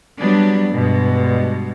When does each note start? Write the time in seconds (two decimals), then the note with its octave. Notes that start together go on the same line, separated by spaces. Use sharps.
0.18 F#3 G3 B3 D4
0.73 G2 B2 G#3